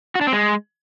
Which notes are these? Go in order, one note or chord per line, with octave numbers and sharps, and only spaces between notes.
F#4
D4
C4
G#3